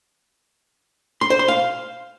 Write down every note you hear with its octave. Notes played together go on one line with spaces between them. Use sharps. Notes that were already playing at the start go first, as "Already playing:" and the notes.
C6
C5
C6
F5